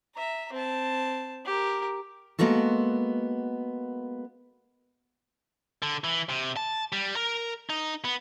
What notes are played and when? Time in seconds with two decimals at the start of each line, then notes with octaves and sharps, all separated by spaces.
0.15 E5 A#5
0.52 C4 A5
1.45 G4 A#4
2.39 G#3 A#3 B3 F#4 A4
5.82 D3
6.04 E3
6.30 C3
6.57 A5
6.93 G3
7.16 A#4
7.70 D#4
8.05 B3